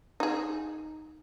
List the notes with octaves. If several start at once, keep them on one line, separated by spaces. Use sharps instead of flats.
D#4 G#4